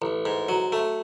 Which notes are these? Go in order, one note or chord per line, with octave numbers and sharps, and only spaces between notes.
A1
G#2
F#3
A3